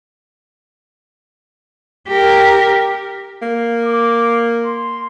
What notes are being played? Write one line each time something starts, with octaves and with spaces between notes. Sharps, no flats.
G4 A#4
A#3
D6
C6